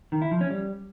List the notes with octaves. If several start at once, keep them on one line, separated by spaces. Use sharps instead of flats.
D#3
E4
F3
C#4
G3